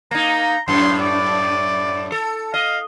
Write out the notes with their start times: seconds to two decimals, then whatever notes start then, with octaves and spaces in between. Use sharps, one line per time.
0.11 A#3 D#4 A#5
0.68 F#2 A2 C6
1.01 D5
2.12 A4
2.54 D#5 F5